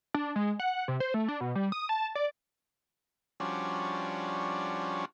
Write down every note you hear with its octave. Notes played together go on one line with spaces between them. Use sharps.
D4
G#3
F#5
C3
C5
A3
D4
B2
G3
D#6
A5
D5
F3 G3 C#4 D4 F#4